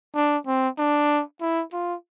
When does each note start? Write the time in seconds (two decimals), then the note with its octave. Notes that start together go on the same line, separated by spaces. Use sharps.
0.15 D4
0.47 C4
0.78 D4
1.41 E4
1.72 F4